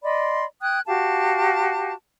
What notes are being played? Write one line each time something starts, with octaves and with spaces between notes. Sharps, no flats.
D5 D#5 B5 C6
G5 D#6 F#6 G#6
F#4 G4 F5 A5